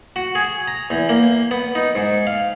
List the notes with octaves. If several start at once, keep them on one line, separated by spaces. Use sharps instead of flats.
F#4
G#4
A#5
E2
A#3
B3
D#4
G#2
F5